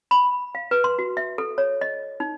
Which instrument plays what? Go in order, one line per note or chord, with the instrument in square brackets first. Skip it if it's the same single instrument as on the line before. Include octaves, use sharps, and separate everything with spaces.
[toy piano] B5
F5
B4
C6
F#4
E5
A4
C#5
D#5
D#4